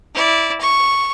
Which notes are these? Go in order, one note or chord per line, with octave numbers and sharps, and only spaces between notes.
E4 D5
C#6